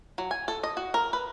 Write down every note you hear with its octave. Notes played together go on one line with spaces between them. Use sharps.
F#3
G#5
A4
D#5
F#4
A#4
B4